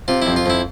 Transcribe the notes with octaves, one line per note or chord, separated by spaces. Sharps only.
C3 F4
F2 E4
F4
F2 E4